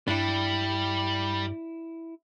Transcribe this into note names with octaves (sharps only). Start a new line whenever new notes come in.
G2 G3 D4 E4